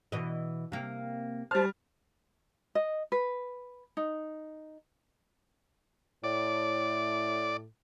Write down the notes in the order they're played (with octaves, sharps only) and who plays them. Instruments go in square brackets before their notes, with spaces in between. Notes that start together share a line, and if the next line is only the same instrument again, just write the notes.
[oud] B2 E3 D#5
C3 A#3
[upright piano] G3 F6 [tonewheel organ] C5 A5
[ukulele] D#5
B4
D#4
[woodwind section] A2 [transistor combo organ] D5